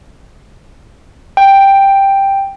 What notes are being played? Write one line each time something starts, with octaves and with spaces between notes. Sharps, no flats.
G5